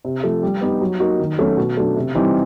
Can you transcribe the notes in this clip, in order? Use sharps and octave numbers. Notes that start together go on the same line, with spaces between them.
C3
F3 A3
G3
B3 D#4 G4
F#3
A#3 D#4 F#4
D#3
F#3 A3 C#4 F#4
B2
F#3 A3 D4
C3
E3 G3 C4 D#4